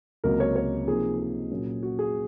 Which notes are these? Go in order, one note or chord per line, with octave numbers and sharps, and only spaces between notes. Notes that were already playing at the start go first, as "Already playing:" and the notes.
C#2 C3 F#3 A#3 A#4
C#5
C#5
C3 F3 A#3 D#4 G#4
G#4
A#2 F#3 C#4
F#4
G#4